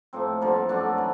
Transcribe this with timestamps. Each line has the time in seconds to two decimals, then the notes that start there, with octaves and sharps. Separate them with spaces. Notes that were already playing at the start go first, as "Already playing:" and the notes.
0.13 A2 F3 A#3 C4
0.41 G2 D3 F3 A#3
0.69 F#2 D3 F#3 A3 D4
0.98 E3